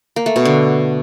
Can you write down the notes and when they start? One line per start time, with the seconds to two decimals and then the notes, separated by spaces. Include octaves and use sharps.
0.16 A#3
0.26 A3
0.36 B2
0.45 D3